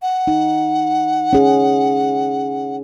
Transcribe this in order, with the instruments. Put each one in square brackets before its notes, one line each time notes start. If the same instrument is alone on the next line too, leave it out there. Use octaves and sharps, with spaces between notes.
[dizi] F#5
[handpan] D#4
C#4 G#4